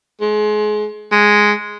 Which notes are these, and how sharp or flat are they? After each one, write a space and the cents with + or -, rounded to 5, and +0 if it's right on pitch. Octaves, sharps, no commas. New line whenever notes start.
G#3 +30
G#3 +0